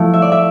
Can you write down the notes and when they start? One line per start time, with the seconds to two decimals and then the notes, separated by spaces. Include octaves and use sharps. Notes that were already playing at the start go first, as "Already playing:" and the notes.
Already playing: F3 A3 E4
0.13 E5
0.22 D5
0.32 E5